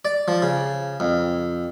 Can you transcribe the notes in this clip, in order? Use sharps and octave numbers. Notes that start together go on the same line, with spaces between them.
D5
F3
C#3
F2